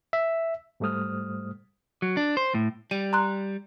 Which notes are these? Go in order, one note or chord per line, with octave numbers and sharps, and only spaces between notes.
E5
G#2 G3 A3 C5 D#6 F6
F#3
D4
C5
A2
G3 D#7
A#5 C6 F#6